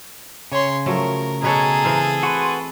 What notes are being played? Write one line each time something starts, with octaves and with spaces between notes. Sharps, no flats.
C#3 C#5 C6
F3 F#3 A3 A#4
B2 G#4 A4 B4 C#5 A#5
E3 C4 F5
F#4 B4 C6